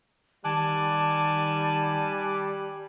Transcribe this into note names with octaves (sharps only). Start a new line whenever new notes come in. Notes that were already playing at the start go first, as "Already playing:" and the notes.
D#3 G3 G#5 A5 D6 F#6